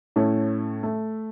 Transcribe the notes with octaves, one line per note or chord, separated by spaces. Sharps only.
A2 A3 C#4
A3